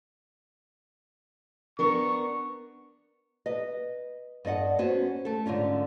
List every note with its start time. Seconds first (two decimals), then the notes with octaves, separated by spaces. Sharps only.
1.79 B3 D4 A#4 C#6
3.46 B4 D#5
4.45 G2 D5 D#5 F#5
4.78 B3 C#4 F#4 C5
5.25 A3 A4
5.46 G#2 D3 C#4 F4